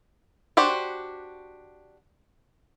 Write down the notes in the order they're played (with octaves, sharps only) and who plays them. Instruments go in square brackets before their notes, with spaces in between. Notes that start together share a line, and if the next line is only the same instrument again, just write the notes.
[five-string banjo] D4 F#4 G4 C5